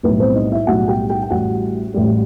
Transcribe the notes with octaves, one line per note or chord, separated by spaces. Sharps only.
B1 A2 G3 B4
C4 C5
D#4 D#5
E4 E5
B1 A2 G3 F#4 F#5
G4 G5
G4 G5
G5
A1 A2 G3 F#4 F#5
A1 A2 G3